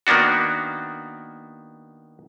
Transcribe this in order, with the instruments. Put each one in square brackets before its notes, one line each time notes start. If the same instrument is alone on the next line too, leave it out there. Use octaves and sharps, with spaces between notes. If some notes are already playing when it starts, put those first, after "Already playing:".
[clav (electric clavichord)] D#3 A#3 B3 D4 F#4